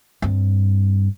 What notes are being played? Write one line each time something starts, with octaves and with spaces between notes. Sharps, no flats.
G2 C4